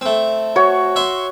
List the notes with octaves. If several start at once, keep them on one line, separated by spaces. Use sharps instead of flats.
A3 C4
F#4 C#5
E5 C6